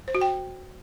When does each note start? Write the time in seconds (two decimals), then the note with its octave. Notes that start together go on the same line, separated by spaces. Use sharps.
0.08 C5
0.15 F#4
0.21 G5